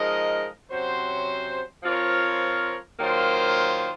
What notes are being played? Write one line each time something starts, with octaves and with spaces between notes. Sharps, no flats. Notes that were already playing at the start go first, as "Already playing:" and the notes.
Already playing: F3 G#3 D#4 A#4 D#5
C3 F#3 C#4 F#4 C5
F3 C4 F4 A#4 C#5
D#3 F#3 A#3 F4 C5